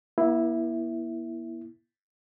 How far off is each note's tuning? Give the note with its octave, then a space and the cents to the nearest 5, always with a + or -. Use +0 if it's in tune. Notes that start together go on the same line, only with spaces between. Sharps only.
A#3 +45 E4 +0